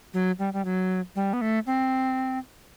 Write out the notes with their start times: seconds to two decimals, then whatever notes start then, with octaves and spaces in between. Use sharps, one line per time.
0.14 F#3
0.39 G3
0.53 G3
0.65 F#3
1.15 G3
1.33 B3
1.41 A3
1.66 C4